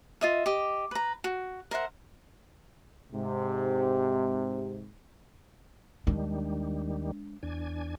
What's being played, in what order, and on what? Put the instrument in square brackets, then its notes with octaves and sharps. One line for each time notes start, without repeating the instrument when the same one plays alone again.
[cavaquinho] F4 D#5 E5
G4 D#5
B4 A#5
F#4
A#4 C5 E5 F#5
[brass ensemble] G#2 C3
[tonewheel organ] D#2 D#3 G3 [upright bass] G#3 D4
[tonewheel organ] E2 D4 G#5